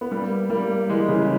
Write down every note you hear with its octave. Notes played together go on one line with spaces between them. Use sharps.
B3
G3 A#3
G3 A#3
E3 G#3
C#3 E3